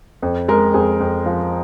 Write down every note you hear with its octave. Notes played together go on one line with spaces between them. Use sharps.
F2
G#3 A#4
F2 G#4
F2
F3